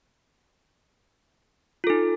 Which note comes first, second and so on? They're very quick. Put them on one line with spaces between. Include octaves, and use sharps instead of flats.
F4 A4 D#4